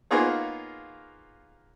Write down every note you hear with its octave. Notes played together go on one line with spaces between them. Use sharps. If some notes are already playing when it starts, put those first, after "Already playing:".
A#3 B3 D#4 F4 G#4 C#5